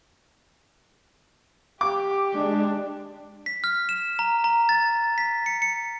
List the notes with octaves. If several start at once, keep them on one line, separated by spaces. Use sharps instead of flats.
G4 D6
G#3 D4
B6
F6
E7
A#5
A#5
A6
B6
C#7
C#7